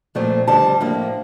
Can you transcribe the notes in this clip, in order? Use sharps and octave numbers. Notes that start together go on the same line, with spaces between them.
A#2 F3 A3 C4
F2 D3 G3 C4 A5
A2 F3 A#3 D4